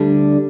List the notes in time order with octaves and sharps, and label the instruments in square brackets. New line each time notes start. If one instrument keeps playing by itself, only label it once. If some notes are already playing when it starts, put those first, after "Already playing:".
Already playing: [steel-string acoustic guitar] D2 D3 G3 D4